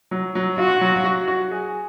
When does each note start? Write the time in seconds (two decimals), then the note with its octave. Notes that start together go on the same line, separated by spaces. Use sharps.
0.11 F#3
0.35 F#3
0.58 F4 F#4
0.81 F#3
1.05 F#4
1.28 F#4
1.51 G#4